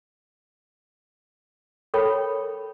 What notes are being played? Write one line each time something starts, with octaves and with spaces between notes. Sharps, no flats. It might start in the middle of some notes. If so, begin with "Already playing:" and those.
A4 A#4 C#5 G5 B5